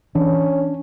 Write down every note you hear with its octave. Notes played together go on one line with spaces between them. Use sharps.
E3 C#4 D4